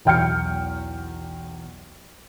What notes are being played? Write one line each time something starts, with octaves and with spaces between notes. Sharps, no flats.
B1 E2 G5 F6 G6 C#7